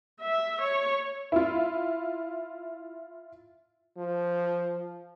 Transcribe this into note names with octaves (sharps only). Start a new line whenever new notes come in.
E5
C#5
E4 F4
F3